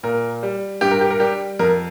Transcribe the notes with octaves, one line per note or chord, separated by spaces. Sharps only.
A#2 A#4
G3
G2 G4
A#4
G4
A#4
G3 G4
F2 A#4